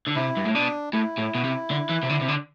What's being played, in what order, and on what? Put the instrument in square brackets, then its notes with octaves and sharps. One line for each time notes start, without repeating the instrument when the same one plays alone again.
[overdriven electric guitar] D3
[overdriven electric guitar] C3 [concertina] E4
[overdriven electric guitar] G2
A2
[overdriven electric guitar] B2 [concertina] D4
[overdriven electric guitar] A2 [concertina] E4
[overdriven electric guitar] A2
B2
C3
D3
E3
C3
D3
C3
D3